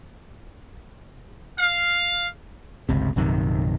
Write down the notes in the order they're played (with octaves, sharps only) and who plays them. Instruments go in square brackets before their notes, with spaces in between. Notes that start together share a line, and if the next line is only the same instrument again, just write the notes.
[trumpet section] F5
[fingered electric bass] G1 C#2 C3
A#1 F#2 C3 D#3